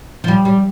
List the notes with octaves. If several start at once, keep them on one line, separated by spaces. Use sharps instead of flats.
F3
G3
G3